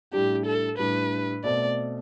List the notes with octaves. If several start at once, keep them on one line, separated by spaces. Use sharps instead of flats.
A2 G3 D4 G4
A4
A2 G3 D4 B4
B2 A3 C4 D5